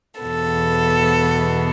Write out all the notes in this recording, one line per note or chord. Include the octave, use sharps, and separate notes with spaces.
E2 B2 B3 A4